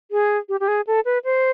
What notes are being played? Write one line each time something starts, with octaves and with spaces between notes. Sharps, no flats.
G#4
G4
G4
G#4
A4
B4
C5